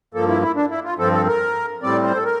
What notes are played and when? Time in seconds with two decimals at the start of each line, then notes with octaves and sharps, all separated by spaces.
0.14 G2 F3 A#3 A4
0.28 E4
0.42 E4
0.56 D4
0.70 E4
0.84 F4
0.98 G2 F3 C4 A4
1.13 A4
1.27 A#4
1.83 A2 G3 C4 D5
2.03 C5
2.15 A4
2.24 A#4